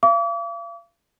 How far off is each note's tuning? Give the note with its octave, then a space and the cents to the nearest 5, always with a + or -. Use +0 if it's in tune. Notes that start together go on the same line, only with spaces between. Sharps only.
F5 -40 D6 -40